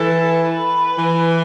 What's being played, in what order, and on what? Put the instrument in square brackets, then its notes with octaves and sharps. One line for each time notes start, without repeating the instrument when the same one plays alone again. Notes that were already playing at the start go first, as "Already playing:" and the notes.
Already playing: [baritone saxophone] E3 [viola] A4
[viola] B4
[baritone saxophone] E3